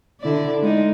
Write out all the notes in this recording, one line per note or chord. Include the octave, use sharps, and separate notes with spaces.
D3 E4 D5
G#3 D#4